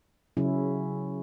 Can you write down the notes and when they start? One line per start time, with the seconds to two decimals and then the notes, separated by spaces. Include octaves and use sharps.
0.37 C#3 F#3 C#4 E4